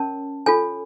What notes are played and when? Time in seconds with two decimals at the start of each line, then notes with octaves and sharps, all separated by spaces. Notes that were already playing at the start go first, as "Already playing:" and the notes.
Already playing: C#4 A#4 C#5 A5
0.46 F4 A4 C#5 G#5